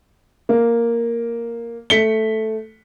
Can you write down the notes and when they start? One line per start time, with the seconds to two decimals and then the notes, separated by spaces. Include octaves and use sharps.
0.49 A#3
1.90 A3 B6 C#7 G7